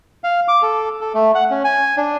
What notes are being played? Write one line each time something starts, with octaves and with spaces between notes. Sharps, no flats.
F5
D6
A4
A4
A3
F#5
C#4
G#5
D4